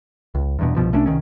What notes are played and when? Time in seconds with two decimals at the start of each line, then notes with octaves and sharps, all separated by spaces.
0.35 C#2
0.59 E2 G2 B2
0.77 C2 G2 B2 F3
0.93 C2 A3 C#4 D4
1.06 C2 D#3 C#4